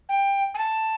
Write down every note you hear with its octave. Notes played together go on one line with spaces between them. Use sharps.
G5
G#5
A5